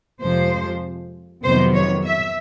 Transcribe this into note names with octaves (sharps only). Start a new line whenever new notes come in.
F2 C3 F3 G#3 C5
F2 C3 D#3 F#3 B3 C5
C#5
E5